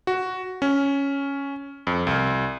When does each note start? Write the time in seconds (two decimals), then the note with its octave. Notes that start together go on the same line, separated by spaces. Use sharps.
0.07 F#4
0.62 C#4
1.87 F2
2.07 C2